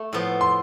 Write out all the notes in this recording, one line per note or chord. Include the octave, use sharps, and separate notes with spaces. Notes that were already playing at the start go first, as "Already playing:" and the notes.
Already playing: A3
A2 F3 B3
C6